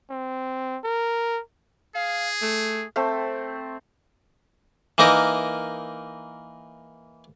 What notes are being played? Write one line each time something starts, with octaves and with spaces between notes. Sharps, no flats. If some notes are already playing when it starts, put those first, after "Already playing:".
C4
A#4
G#4 F5
A3
A3 C4
E3 A#3 D#4 A#4